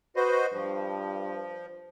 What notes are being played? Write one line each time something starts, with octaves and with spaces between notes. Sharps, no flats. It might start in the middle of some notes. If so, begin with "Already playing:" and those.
F#4 B4 C5 D#5
G2 F3